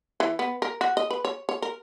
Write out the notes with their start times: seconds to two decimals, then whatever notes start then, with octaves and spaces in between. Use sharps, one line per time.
0.20 E3
0.39 B3
0.62 A#4
0.81 F#4
0.97 D#5
1.10 B4
1.25 C#5
1.49 C#5
1.62 A#4